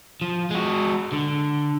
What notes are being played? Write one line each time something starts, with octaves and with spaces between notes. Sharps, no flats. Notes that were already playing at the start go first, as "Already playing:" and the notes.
F3
G#3 F#4
D3